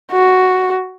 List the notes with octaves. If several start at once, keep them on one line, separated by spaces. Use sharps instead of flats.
F#4